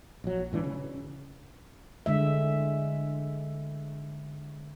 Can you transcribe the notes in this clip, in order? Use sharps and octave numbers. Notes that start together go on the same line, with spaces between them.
A#1 F#3
D1 G#2 E3 D4
C#3
D3 G#3 E5